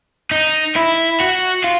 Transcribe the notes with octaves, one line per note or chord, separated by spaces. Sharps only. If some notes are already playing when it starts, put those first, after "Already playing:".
D#4
E4
F#4
F4